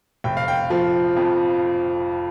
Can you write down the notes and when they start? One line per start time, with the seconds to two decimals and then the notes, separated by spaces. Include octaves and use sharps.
0.24 F1 G5
0.37 F5
0.48 G5
0.70 F3
1.17 F2